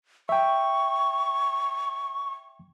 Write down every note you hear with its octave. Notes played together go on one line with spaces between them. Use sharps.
E5 G5 C#6